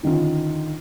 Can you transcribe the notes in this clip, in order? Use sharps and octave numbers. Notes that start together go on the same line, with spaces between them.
D3 D#3 C#4 F4